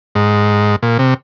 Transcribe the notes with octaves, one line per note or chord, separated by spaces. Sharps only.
G#2
A#2
C3